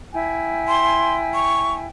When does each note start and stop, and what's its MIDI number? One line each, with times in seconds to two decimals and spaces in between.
0.13 1.87 64
0.13 1.87 79
0.13 1.87 80
0.68 1.15 84
1.34 1.73 85